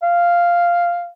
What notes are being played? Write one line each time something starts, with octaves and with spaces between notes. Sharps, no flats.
F5